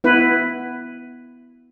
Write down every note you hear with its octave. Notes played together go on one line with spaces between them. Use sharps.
B3 E4 B4